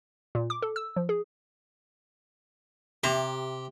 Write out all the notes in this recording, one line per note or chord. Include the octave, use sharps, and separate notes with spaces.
A#2
D6
A4
E6
F3
G#4
C3 G4 A#5